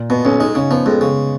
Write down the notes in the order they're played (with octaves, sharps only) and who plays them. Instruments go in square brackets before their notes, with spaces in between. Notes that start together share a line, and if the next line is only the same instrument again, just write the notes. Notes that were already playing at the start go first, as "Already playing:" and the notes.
Already playing: [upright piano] A#2
[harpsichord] B2 [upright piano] B3
[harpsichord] B1 [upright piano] C#4
[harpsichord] G#3 [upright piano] D#4
[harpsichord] C#3 [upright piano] C#4
[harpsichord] F3 [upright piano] B3
[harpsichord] F2 [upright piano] G#3
[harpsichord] C#3